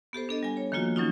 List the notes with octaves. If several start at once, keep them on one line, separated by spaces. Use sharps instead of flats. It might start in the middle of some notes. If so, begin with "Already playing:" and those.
B3 G4 A4 C5
D4 A4 D#5
G3 G#5
C#5
D#3 F3 A#3 F4 F#4
E3 F#3 C#4 D#4 F4